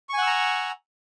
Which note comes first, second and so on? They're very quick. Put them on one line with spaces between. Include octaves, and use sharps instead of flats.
C#6 G#5 F#5 E6 A#5